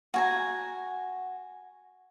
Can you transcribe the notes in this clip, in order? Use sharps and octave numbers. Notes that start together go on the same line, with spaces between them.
F#4 G#5 A#5